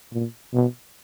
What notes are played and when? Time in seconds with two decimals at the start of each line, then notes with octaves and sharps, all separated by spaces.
0.13 A#2
0.53 B2